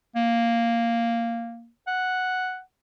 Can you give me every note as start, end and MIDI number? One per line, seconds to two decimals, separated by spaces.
0.16 1.69 58
1.87 2.60 78